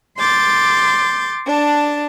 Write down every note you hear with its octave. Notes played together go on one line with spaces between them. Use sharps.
C6 D6 G6 A6
D4 A5